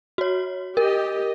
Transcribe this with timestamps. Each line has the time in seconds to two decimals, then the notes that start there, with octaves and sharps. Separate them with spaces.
0.18 F#4 C#5
0.77 G4 A#4 D#5